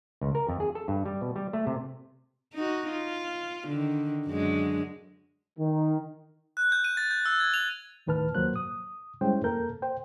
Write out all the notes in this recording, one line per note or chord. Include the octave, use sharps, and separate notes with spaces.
C#2
A#4
F2
G#4
A4
G2
G3
B2
G3
A3
C3
D#4 F#4
F4
D3 D#3
F#2 D3 G#3
D#3
F#6
G6
D#7
A6
G6
E6
G#6
F7
D#2 A2 D#3 B4 A5 F6
D#2 F3 F#3 A#3 C5 F#6
D#6
G3 G#3 C#4 E4 C5 G5
F2 A#3 A4 A#4 G6
C5 G5